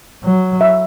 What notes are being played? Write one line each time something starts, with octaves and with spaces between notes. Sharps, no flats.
F#3
E5